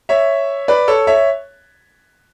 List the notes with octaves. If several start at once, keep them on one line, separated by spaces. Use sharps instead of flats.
C#5 E5
B4 D5
A4 C#5
C#5 E5